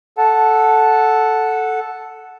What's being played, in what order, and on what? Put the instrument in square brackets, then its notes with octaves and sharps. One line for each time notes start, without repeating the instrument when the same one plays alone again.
[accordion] A4 F#5 A5